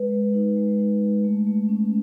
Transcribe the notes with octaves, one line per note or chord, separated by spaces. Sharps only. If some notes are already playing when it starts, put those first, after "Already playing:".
Already playing: G#3 B4
G#3
D#4
G#3
D#4
G#3
A3
A3
C#4